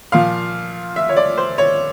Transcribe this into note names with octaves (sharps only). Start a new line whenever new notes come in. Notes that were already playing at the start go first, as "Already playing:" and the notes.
A#2 F3 F5
E5
C#5
D5
C5
C#5